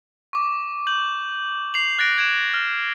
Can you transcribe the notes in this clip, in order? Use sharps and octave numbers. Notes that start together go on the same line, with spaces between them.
C#6 D6
G6 F#7
C7 F7 F#7
F#6 A6 A#6 D7
G#6 D7 E7
F6